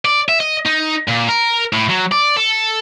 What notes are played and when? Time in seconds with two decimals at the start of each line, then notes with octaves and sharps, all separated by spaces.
0.05 D5
0.29 E5
0.40 D#5
0.66 D#4
1.08 A#2
1.28 A#4
1.73 A2
1.90 F#3
2.12 D5
2.37 A4